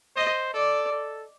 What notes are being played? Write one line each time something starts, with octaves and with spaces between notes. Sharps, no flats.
C5 D#5
A4 D5
A4